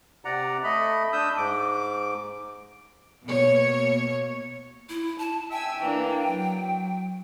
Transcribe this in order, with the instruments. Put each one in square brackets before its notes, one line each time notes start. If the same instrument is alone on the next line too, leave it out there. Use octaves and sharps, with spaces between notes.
[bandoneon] C3 D5 F#5 A#5
A3 D#5 B5
D4 D#6 E6 G6
G#2 D6
[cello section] B2 A#3 C#5
[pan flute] E4
A5
[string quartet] E5 G#5 E6 [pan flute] G5
[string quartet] E3 A#3 D4
F#3